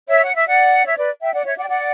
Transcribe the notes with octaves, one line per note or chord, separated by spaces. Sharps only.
C#5 E5
F#5
E5
D5 F#5
C#5 E5
B4 D5
E5 G5
D5 F#5
C#5 E5
D5 F#5
G5
D5 F#5